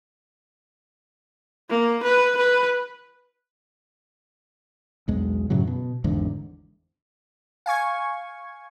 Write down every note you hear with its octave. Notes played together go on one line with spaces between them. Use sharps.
A#3
B4
B4
B1 E2 G#3
F#2 A2 C#3 F#3
B2
G#1 E2 G#2 D3
F5 G#5 C#6 G#6